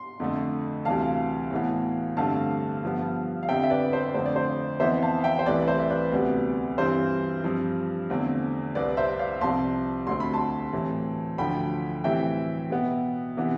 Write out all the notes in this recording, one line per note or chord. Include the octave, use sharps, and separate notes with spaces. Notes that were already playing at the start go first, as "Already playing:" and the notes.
Already playing: C6
F2 D3 A3
D2 C3 E3 G3 F5 A5
A2 E3 B3
G2 D3 A3 C4 F5 A5
G2 F3 B3
F5
F2 D3 G3 C4 E5 G5
E5
B4 D5
C5
F2 D3 A3 C5
D5
C5
F2 E3 B3 C5 E5
F5 A5
E5 G5
C5
C2 C3 E3 A3 B4 D5
C5 E5
E5
B4 D5
D2 C3 G3 B3
G2 E3 G3 C4 C5
G2 F3 C4
E2 D3 A3 C4
C2 C3 G3 C4 B4 D5
C5 E5
D5 F5
C2 C3 F3 C4 A5 C6
D2 D3 A3 C4 C6
B5
A5 C6
A2 E3 G3 C4
D2 D3 F3 G5 B5
A2 E3 G3 C4 E5 G5
B2 B3
C3 E3 B3